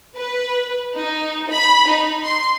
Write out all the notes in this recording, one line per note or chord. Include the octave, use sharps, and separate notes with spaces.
B4
D#4
B5
D#4
C6